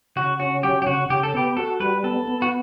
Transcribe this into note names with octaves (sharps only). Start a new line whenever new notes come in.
C#3 F#4
C#4 F#4
F#3 G4
G4
C#3 F#4
C#3 G4
A4
B3 G4
F#4 A4
G3 B4
B3 A4
B3
F#4